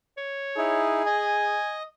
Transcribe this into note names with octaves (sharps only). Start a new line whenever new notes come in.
C#5
D#4 E4 G#4
D#5 G#5